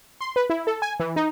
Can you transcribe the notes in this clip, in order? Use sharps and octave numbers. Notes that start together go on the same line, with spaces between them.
C6
B4
E4
A4
G#5
E3
D#4